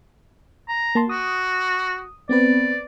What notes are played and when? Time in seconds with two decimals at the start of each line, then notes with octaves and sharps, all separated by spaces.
0.68 A#5
0.95 A#3 A5 C6
1.09 F#4 D#6
2.29 B3 C4 B4 D5